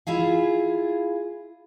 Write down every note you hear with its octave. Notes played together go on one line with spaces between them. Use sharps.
E4 F4 G#4 F5